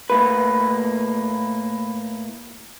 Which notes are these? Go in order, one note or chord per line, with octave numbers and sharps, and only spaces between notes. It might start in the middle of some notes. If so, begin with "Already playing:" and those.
A2 A#3 B4